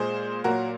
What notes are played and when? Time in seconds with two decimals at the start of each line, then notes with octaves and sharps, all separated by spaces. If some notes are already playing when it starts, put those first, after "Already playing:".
Already playing: A#2 G#3 G#4 C5
0.44 A#2 F#3 A#3 F#4 A#4